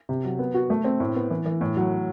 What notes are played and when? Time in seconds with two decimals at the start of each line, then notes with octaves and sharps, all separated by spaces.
0.09 C3
0.25 F#3
0.39 B3
0.54 F#4
0.70 A3
0.84 C4
1.00 A2
1.16 B3
1.30 E3
1.46 E3
1.61 A2
1.77 F#3